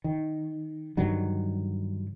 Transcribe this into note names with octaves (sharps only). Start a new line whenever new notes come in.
D#3
G2 D3 D#3 F#3